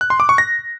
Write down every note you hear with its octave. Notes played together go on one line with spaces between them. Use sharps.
F#6
C6
D6
C#6
A#6